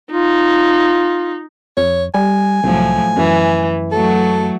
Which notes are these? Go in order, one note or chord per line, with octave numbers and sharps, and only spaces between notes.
D#4 F4
F2 C#5
G3 G#5
C2 A2 F3 F#3
F#2 E3
F#3 A3 F#4 A4